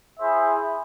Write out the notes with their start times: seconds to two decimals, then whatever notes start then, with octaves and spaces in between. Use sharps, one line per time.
0.19 E4 G#4 C5 E5